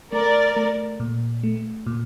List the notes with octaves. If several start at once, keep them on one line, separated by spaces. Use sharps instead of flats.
A3 A#4 D5
A3
A#2
A3
A#2